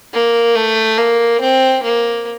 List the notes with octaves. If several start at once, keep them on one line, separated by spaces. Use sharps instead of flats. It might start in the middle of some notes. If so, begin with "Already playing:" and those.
A#3
A3
A#3
C4
A#3